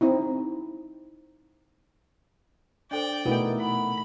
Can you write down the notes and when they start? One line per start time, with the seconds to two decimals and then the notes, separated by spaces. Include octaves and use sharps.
0.01 C4 D#4 E4
2.91 D4 A4 C5 D5 G5
3.26 B2 A3 B3 D#4 E4 A#4
3.60 F#5 B5